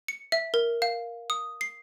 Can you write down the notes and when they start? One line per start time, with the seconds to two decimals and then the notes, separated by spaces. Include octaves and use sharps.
0.08 C#7
0.32 E5
0.54 A#4
0.82 F5
1.30 D#6
1.61 C7